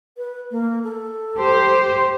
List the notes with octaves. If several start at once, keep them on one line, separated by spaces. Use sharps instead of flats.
B4
A#3
A4
G4 C5